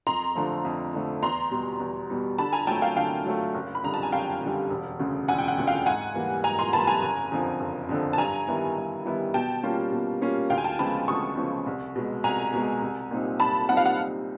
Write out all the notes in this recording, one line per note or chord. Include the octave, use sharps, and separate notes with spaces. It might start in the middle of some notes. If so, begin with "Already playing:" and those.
F2 A#5 C6
D3 F3 A3
F2
D3 F3 A3
E2 A#5 C6
B2 G3
E2
B2 G3
D3 A5 B5
G#5 A#5
F#3 A3 G5 A5
F5 G5
D3 F5 G5
F#3 A3
F#1
B5
F2 D3 G3 A#5
A5
G#5
F#1 F5 G5
F2 D3 G3
E1
D2 C#3
E1 F#5 G#5
G5
F#5
D2 C#3
F5 G5
G#2 F#5 G#5
E3 G3 A#3
G#2 G#5 A#5
A#5 C6
E3 G3 A#3 A5 B5
G#5 A#5
F#1
F2 D3 F3
F#1
F2 D3 F3
A5
G2 G#5 A#5
D#3 G3 B3 E4
G2
D#3 G3 B3 E4
B2 G5 A5
G3 A#3 C#4 F4
B2
G3 A#3 C#4 F4
D2 F5 G5
G#5
G5 A5
C#3 F3 G#3 B3 A5 B5
D2 C#6 D#6
C#3 F3 G#3 B3
C2
B2 G#3
C2 G#5 A#5
B2 G#3
C2
A#2 G3 C4 D#4
C2 A5 B5
A#2 G3 C4 D#4 F#5
F5
F#5